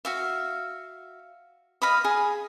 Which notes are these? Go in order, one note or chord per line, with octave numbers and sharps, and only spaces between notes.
F#4 E5 F5
D#5 F5 B5 D#6
G#4